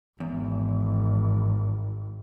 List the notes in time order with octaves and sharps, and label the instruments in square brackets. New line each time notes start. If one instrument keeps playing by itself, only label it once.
[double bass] G#1 [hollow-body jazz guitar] E2